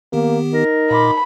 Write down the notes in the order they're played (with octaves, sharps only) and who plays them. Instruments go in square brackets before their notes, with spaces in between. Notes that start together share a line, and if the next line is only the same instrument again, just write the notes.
[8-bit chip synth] D#3 B3 G4 [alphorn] A#3
[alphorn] D#4 [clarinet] A#4
[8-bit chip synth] A#2 C6 D6 [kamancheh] B5